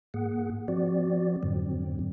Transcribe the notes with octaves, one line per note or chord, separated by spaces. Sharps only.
G#2 A#3 G#4 F#5
F3 C4 F#4 D5
F2 G#2 D3 F#3 C4